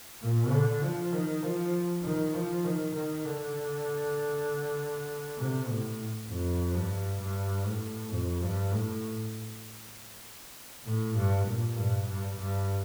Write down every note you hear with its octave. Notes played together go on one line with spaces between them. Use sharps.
A#2
D3
F3
D#3
F3
D#3
F3
D#3
D#3
D3
C3
A2
F2
G2
G2
A2
F2
G2
A2
A2
G2
A#2
G2
G2
G2